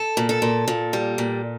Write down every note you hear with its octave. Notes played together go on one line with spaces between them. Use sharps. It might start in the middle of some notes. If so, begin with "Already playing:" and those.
Already playing: A4
A#2
A4
A#2
A#2
G3
A#2